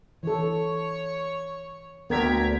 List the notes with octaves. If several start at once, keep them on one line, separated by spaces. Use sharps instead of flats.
E3 A4 C#5 C#6
D2 A#3 B3 A#4 G5 A#5 G#6 B6